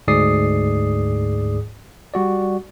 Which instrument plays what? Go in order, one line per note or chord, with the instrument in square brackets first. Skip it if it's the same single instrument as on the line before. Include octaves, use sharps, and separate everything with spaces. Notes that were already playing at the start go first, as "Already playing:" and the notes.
[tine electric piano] D2 G#2 G#4 D5 D#6 C7
G3 F#4 D5